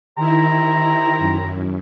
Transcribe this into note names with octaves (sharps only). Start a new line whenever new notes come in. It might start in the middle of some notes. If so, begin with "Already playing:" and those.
D#3 E4 G4 C5 A#5
F#2